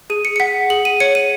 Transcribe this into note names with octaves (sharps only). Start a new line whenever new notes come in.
G#4 D#7
C#7
C#7
F#5 B6
G#4 F#7
D#7
C#5 C#7
D#7